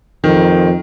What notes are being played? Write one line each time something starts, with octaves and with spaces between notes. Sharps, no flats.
F2 D#3